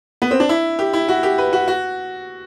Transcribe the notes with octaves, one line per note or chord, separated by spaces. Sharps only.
B3
C4
D4
E4
G4
E4
F#4
G4
B4
F#4
F#4